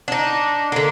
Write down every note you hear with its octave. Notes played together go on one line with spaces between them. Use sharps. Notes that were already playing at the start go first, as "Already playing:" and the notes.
D4 D#4
D3 A#3